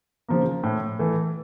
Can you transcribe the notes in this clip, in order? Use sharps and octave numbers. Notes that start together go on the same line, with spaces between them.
C#3 F3 A#3
A2
E3 A3